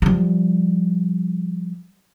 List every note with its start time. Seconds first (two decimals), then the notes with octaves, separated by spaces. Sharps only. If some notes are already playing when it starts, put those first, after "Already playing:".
0.02 F3 G3